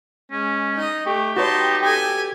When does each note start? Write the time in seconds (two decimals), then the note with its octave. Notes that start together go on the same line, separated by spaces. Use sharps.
0.32 G#3 C#4
0.76 D#4 D#5
1.06 A3 G4 C#6
1.37 D#4 F#4 B4 C#5 A5 C6
1.83 G4 A4 G#5